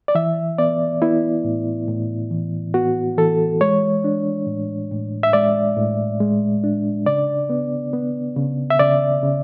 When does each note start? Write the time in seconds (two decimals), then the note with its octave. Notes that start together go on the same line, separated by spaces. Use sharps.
0.08 D5
0.15 E3 E5
0.58 B3 D5
1.02 B3 E4
1.44 A2
1.88 A2
2.31 E3
2.74 B3 F#4
3.18 E3 A4
3.61 G#3 C#5
4.04 D4
4.47 A2
4.91 A2
5.23 E5
5.33 G#3 D5
5.76 A2
6.20 G#3
6.64 D4
7.06 C#3 D5
7.50 B3
7.93 B3
8.36 C#3
8.70 E5
8.79 C#3 D5
9.23 C#3